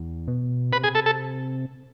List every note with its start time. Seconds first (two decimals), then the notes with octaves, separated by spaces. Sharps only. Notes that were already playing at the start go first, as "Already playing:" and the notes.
Already playing: E2
0.28 B2
0.72 C3 B4
0.84 G#4
0.95 A4
1.06 A4